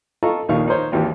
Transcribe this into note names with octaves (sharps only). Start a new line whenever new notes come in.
F4 A4 D#5 A#5 C#6
A#1 D#2 D#3 D#4 F5 C#6
D#4 A#4 C5 C#5
G#1 D#2 E3 G4